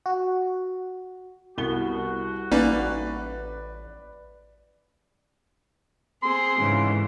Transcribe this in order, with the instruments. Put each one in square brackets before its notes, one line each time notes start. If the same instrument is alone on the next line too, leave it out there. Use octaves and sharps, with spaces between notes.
[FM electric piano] F#4
[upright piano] C2 G7 [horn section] G3 F#4 [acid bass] B3
[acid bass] A1 [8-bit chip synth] A#3 C#4 D#4 [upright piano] B4 D5
[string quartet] C4 G#4 [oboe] C6
[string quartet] G#2 C#3 E3